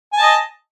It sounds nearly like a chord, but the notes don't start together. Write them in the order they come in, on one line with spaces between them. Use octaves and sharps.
G#5 A5 D#5